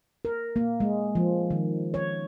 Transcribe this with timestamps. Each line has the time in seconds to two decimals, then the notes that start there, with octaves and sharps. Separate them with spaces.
0.25 A#4
0.56 A#3
0.80 G#3
1.15 F3
1.51 D#3
1.94 C#5